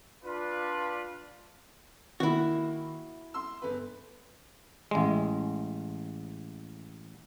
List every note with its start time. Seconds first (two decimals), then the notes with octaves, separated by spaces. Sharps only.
0.24 D4 F4 B4
2.20 D#3 A#3 E4 F#4
3.34 C6 E6
3.62 G1 B4
4.91 A1 G#3